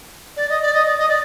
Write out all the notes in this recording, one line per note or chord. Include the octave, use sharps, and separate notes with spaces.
D5
D#5
D5
D#5
D5
D#5
D5